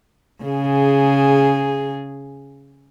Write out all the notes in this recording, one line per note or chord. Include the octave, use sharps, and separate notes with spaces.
C#3 G#4